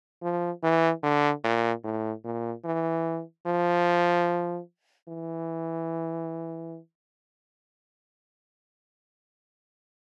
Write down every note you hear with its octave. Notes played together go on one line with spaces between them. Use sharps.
F3
E3
D3
A#2
A2
A#2
E3
F3
E3